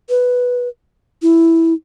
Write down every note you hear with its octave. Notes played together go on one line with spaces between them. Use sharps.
B4
E4